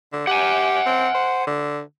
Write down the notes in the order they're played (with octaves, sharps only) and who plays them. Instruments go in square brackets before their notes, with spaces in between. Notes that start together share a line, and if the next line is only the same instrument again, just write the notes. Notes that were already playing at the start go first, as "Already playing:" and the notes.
[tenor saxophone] D3
[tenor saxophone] G4 [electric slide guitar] F#5 G#5
[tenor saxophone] C4
C5
D3